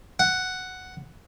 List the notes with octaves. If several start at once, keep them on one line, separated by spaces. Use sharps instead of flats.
F#5